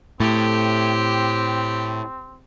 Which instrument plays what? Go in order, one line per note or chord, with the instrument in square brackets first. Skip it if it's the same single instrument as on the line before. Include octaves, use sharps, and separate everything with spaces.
[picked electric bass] A2 [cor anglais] C4 [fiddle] G4